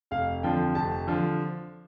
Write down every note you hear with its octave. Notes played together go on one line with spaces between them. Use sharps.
F1 F5
F2 D3 F3 G5
F1 A5
D3 F3